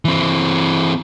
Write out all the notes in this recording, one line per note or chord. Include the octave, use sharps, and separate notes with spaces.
E3 C4